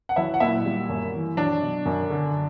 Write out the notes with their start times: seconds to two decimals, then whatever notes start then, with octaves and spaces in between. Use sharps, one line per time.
0.09 F#5
0.16 F#3 E4 E5
0.34 F#5
0.40 A#2 E4 E5
0.66 G3
0.89 F#2
1.14 E3
1.37 F#3 D4 D5
1.62 B2
1.86 F#2
2.10 D3